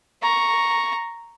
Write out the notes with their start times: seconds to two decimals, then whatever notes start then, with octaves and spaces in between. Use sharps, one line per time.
0.23 A#5 C#6